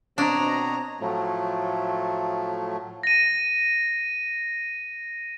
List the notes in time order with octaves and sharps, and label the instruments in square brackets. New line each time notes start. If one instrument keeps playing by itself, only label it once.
[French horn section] B2 C4 [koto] D4 [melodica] C#5 D#5 [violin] A#5
[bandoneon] A2 F3 F#3 A3
[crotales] A#6 D#7